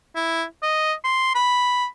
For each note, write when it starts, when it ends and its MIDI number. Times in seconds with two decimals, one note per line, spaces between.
0.15 0.44 64
0.62 0.93 75
1.04 1.32 84
1.35 1.86 83